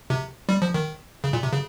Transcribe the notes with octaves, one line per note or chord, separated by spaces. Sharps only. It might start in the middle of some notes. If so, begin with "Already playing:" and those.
C3
G3
F3
D#3
C#3
A#2
C3
C#3